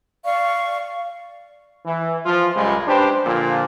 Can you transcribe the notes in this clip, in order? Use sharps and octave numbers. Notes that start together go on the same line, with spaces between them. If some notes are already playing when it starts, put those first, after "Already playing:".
D5 F5 C#6
E3
F3 F4
C#2 F#2 G3 G#3
D4 G4 B4 C5
A#2 D3 F3